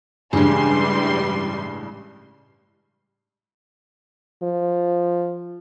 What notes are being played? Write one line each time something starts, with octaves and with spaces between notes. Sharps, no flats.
A1 G2 C#3 E3 G3 G#3 C6
F3